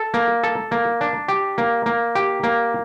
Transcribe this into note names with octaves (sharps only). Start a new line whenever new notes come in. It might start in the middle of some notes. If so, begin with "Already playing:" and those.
Already playing: A4
A#3
A4
A#3
D4
G4
A#3
A#3
G4
A#3